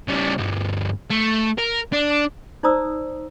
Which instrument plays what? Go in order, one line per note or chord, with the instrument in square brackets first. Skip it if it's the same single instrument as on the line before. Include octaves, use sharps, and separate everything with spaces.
[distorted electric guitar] C#3 G3
D2 G2
A3
A#4
D4
[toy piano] D#4 C5 D5 A#5 D#6 E6